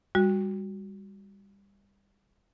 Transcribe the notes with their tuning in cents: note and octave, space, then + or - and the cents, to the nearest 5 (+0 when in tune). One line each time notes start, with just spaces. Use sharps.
G3 +25 F#4 +0